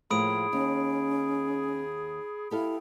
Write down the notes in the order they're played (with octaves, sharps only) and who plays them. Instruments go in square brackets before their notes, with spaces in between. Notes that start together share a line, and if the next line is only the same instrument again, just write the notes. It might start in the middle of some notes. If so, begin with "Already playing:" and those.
[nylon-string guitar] A2 F3 A#3 [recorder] G#4 [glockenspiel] B5 D#6 D7
[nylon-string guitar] D#2 [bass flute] C#4
[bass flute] E4 [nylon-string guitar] G4 A4 F5